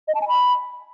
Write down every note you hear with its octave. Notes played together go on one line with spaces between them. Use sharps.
D#5
A5
G#5
B5